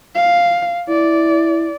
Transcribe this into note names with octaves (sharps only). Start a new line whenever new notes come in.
F5
E4 D5